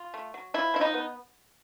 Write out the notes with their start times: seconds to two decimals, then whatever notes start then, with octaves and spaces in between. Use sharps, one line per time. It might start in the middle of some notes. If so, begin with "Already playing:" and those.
Already playing: F4
0.14 A3
0.34 F#3
0.54 F3 E4
0.74 F3 E4
0.81 D#4
0.94 B3